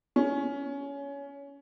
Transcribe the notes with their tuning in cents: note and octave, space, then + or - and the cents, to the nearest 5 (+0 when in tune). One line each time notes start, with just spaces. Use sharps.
C#4 +20